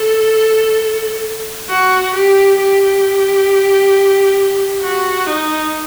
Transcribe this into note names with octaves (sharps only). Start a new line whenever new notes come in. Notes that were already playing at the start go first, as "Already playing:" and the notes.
Already playing: A4
F#4
G4
G4
F#4
D#4